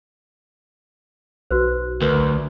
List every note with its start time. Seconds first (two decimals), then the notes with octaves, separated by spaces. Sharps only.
1.51 B1 F#4 B4 C5
2.02 D2 A#4 B4